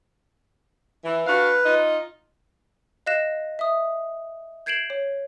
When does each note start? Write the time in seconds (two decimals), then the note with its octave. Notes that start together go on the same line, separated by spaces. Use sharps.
1.04 E3
1.27 D4 F#4 B4 F5
1.65 D#4 F4 D#5
3.06 D#5 F5 F#6 A#6 E7
3.59 E5 D#6
4.66 G6 G#6 C7 D7 E7 F#7
4.90 C#5